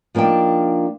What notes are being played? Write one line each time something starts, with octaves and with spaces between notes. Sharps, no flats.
F3 A#3 D4 D#4 G5